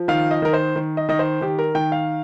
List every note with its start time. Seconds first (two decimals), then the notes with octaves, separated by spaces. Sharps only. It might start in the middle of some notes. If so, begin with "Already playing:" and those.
Already playing: F3
0.08 D#3 F5
0.31 D#5
0.42 D#3 A#4
0.53 C5
0.76 D#3
0.97 D#5
1.09 D#3 D#5
1.19 C5
1.41 D#3 G4
1.59 A#4
1.75 D#3 G5
1.92 F5